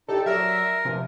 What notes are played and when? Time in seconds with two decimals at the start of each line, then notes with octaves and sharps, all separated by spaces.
0.08 D#4 E4 G4 A4 D5
0.26 F#3 A#4 D5 E5
0.85 E2 C3 F3 G#5